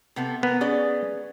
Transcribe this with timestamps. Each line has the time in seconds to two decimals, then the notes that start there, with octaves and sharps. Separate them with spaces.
0.16 C3 B3 A4
0.43 B3 A#4
0.61 C#4 G#4 D5